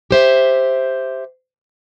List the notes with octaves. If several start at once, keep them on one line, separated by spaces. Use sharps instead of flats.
G4 C5 E5